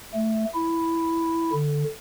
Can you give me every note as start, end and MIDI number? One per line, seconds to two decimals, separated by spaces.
0.14 0.45 57
0.55 1.52 64
1.52 1.84 50